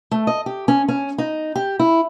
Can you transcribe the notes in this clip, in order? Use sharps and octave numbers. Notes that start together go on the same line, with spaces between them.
A3
D#5
G4
C#4
C#4
D#4
G4
E4